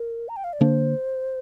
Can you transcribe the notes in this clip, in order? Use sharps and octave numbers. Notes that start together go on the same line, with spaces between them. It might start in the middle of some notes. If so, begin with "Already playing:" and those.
Already playing: A#4
A#5
G5
F5
D5
D3 A#3 D4 C5